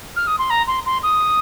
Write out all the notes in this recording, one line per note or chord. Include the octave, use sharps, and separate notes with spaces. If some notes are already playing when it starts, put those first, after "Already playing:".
F6
D#6
C6
A#5
C6
C6
D#6